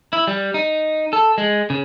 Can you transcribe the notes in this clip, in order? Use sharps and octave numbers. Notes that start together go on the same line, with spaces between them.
E4
G3
D#4
A4
G#3
C#3